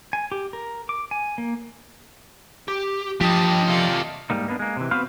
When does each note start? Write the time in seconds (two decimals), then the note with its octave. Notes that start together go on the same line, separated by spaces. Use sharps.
0.13 G#5
0.32 G4
0.53 A#4
0.89 D6
1.11 G#5
1.38 A#3
2.68 G4
3.21 F3 D4 G4 D#5 G5 A5
3.68 C3 F4 A4 D5
4.30 G#2 G3 A#3 D#4
4.48 A#3 B3 D4
4.59 G#3 A#3
4.77 C3 E3
4.91 B3 C4 F#4 B4 C5 F5